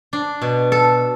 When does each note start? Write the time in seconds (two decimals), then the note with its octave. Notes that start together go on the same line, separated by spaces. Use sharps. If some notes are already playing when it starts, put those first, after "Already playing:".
0.13 D4
0.42 B2
0.72 A4